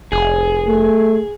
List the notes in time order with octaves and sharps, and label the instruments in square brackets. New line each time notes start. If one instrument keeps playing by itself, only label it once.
[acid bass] F1 [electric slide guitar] G#4
[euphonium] A3